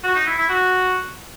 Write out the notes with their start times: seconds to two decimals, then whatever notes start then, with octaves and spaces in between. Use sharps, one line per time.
0.04 F#4
0.15 D#4
0.27 E4
0.38 E4
0.49 F#4